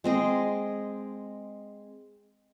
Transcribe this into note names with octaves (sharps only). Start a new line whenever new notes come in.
G#3 C4 D#5